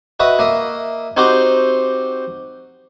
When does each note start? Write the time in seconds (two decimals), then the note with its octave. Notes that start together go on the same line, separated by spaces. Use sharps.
0.20 F#4 B4 D#5 E5
0.39 A#3 D#5 E5
1.17 C4 D#4 F#4 G4 C5